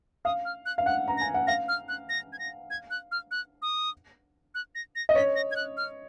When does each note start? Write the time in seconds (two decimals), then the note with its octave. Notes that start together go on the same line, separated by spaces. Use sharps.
0.25 F5 D#6
0.45 F6
0.65 F#6
0.78 F5
0.86 F#5 F#6
1.08 A#5
1.17 G#5 A#6
1.34 F#5
1.47 F5 A#6
1.68 F6
1.88 F#6
2.09 A#6
2.32 G#6
2.39 A#6
2.70 G#6
2.90 F#6
3.11 F6
3.31 F#6
3.62 D#6
4.55 F#6
4.75 A#6
4.95 A#6
5.09 D#5
5.15 C#5 B6
5.35 A#6
5.51 G#6
5.56 F#6
5.77 F6